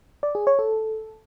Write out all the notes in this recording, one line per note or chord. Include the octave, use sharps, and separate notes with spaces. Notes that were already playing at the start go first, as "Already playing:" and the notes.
D5
G#4
C#5
A4